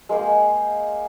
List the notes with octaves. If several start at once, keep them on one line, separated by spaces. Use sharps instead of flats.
G#3 A#3 G5